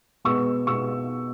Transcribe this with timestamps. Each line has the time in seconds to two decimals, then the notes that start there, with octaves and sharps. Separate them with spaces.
0.24 B2 G#3 B3 C#6 E6
0.67 B2 G#3 B3 C#6 E6